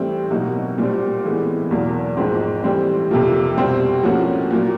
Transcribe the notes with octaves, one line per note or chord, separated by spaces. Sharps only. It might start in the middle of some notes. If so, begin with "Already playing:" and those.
Already playing: A2 E3 G3 C4 E4
B2 F#3 A#3 D#4 F#4
A#2 G3 C4
A2 E3 G#3 B3
E2 B2 F#3 A#3
G#2 F3 G#3 C4
A2 E3 G3 C4
F2 C3 F3 A#3
B2 G3 C4
A2 F3 A#3 C#4 F#4
A#2 F#3 A#3